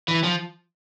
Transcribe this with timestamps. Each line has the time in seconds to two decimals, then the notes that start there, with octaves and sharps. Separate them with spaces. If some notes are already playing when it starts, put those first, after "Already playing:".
0.08 E3
0.24 F3